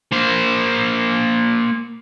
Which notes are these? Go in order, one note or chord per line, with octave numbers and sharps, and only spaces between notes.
A#3 C5